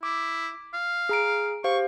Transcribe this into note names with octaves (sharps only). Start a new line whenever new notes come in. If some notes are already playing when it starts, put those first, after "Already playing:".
E4 D6
F5
G#4 A#5 D7
G4 C5 F5 C#6